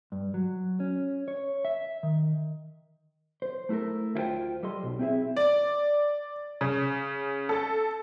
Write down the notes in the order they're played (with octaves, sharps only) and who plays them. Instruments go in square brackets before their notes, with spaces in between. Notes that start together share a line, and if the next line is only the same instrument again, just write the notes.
[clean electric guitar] G2
F#3
C#4
C#5
E5
D#3
C5
A3 E4 F4 A4 A#4
D2 E4 F4 C5 G5
G3 A4 D#5 C6
B1
C4 E4 G#4 E5
[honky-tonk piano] D5
C#3
A4